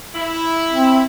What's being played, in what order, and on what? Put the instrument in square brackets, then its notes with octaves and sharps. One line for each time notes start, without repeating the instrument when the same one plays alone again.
[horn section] E4
[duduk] C4